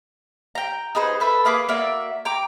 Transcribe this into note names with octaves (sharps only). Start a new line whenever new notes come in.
G5 A#5
D#4 G#4 B4 C5
A4 B4 E5
A#3 G#4 B4 D6
A#3 F#4 D5 E5
G5 A#5 D6